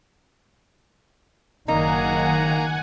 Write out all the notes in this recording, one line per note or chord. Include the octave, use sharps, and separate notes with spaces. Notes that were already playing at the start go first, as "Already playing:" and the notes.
F#1 D#3 A#3 D#4 F#5 G#5 A#5